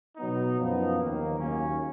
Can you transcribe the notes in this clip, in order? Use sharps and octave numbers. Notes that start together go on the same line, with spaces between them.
B2 F#3 B3 D#4
F#2 F3 B3 D#4
D#2 D#3 A#3
D#2 C#3 F#3 A#3 C#4